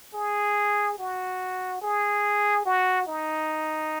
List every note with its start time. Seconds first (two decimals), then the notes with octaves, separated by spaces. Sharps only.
0.14 G#4
0.98 F#4
1.82 G#4
2.65 F#4
3.07 D#4